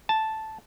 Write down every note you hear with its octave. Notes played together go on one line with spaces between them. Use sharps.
A5